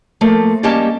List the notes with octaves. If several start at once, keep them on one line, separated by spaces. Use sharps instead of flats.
F3 A3 A#3
G3 A#3 C#4 G4 D#5 A5